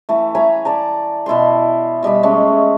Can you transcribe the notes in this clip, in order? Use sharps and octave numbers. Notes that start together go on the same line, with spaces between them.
E3 A3
C#5 G#5 A#5 B5
D5 A5 A#5
B2 E4 A5 C6
B2 G3 D#5 B5
G#3 A3 C#4